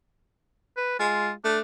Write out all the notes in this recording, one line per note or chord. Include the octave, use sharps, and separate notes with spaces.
B4
G#3 F4
A3 D4